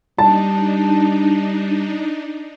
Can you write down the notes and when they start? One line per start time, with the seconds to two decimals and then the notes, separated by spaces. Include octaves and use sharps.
0.18 G3 D4 D#4 A5